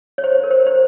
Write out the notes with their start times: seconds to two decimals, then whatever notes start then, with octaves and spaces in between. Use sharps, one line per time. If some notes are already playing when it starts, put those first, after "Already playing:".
0.18 C#5
0.24 C5
0.44 A#4
0.51 C5
0.67 C5